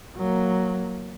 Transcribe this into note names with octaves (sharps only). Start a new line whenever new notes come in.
F#3 A#3